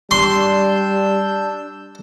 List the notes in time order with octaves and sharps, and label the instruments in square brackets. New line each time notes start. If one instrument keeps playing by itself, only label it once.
[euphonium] G3 [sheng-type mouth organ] D4 E6 G6 [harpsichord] C6